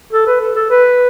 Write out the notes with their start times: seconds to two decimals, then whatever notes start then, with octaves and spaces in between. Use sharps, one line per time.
0.13 A4
0.27 B4
0.41 A4
0.56 A4
0.70 B4